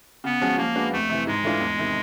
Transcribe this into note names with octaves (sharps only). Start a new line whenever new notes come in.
C#3 B3
F3 G#3 C#4 F#4
F3 A#3
G#3 B3 D4 F#4
F2 A3
C3 E3
G#2 G#3
E3 A3 D4 F4
E2
C3 D#3